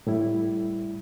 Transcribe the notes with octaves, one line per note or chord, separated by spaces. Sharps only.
A2 G3 E4